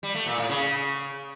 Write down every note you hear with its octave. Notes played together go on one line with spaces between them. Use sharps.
G3
A3
A#2
A2
C#3